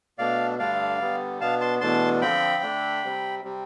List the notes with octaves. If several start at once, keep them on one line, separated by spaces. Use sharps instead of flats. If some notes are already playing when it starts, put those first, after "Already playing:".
B2 A3 D4 D5 F5
G2 D3 A3 D4 D5 F5
D3 G3 B3
B2 B3 D4 F5 A5
A5 C6
E2 B2 A3 D4 A5 C6
D3 F3 C4 G5 B5
D3 A3 D4
C3 G3 C4
C3 G3 C4